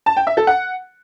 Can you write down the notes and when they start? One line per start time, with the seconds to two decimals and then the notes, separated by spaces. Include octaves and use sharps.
0.06 A5
0.17 G5
0.27 E5
0.37 A4
0.47 F#5